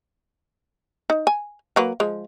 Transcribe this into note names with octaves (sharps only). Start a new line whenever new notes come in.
D#4
G#5
F#3 A#3 B4
F3 G#3